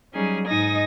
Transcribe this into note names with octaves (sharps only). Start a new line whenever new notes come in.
F#3 G3 C#4 D#4 G#4
G#2 D#4 D#5 G#5 D#6 A#6